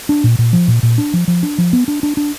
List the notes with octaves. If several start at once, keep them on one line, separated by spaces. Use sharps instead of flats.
D4
A#2
A#2
F3
A#2
A#2
D4
F3
F3
D4
F3
B3
D4
D4
D4